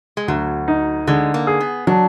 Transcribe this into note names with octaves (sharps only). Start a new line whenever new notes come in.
G#3
D2 F#3
D#4
D3 G#3
A#3
G#4
B3
F#3 D4